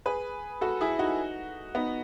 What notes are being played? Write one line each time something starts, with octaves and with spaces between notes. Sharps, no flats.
G#4 B4
F#4 A4
E4 G#4
D#4 F#4
B3 D#4